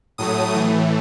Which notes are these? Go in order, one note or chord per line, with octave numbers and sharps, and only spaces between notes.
A2 F#3 A3 D#6
A2 E3 A3